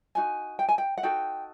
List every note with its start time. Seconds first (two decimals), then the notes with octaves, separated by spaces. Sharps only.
0.15 D#4 F#4 G#5
0.59 G5
0.69 G#5
0.78 G5
0.98 F#5
1.03 D#4 F#4 A4 G5